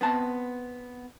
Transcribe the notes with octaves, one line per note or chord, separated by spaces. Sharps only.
B3 C4 A5